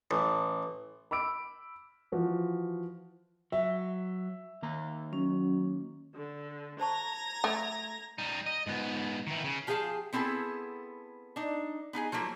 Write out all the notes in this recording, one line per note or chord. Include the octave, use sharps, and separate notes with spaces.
A1
B5 D6 E6 D7
E3 F3 F#4
F#3 E5
D#3 A#3 A#5
F#3 C#4
D3
C5 A5 A#5 C#6 G#6 A#6
A3
G3 D#4
D#5
G#2 B3
D#3 E3
C#3
F3 G4 G#4 A#4 F5 A5
B3 C4 E4 G#4 A4
D4 D#4
B3 D#4 G#4 G#5
F3 F#3 A3 A#3